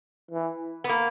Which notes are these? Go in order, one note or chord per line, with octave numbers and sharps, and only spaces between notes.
E3
B3
A#3